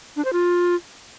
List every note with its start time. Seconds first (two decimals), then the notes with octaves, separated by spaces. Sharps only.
0.16 D4
0.25 C5
0.33 F4